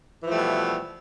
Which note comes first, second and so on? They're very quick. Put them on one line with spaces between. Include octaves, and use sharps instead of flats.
E3 F3 A3 G3 B2